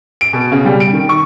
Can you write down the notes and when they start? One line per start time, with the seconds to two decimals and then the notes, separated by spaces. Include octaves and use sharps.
0.21 D7
0.33 B2
0.52 C#3
0.65 G3
0.80 D7
0.93 D#3
1.09 C#6